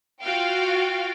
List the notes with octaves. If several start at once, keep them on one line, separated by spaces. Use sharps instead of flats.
F4 F#4 F5 G5